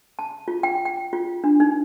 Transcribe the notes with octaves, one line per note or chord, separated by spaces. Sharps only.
A5
F4
G5
G5
F4
D4
D#4